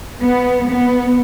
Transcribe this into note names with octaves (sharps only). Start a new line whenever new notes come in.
B3
B3